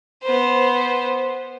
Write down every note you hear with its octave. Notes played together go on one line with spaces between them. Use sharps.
B3 C5